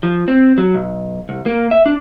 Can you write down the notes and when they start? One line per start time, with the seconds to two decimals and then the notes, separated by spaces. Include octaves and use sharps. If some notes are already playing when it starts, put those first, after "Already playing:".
0.03 F3
0.28 C4
0.58 F#3
0.74 B1
1.29 C2
1.46 A#3
1.71 E5
1.86 D4